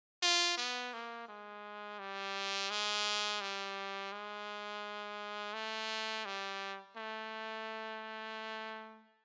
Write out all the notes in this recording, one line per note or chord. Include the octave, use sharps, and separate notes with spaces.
F4
B3
A#3
G#3
G3
G#3
G3
G#3
A3
G3
A3